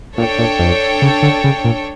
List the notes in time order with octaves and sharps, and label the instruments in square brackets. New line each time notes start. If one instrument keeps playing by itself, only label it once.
[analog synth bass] A#2 [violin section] D4 A4 C#5 G5
[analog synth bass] A#2
F2
C#3
D3
C#3
A#2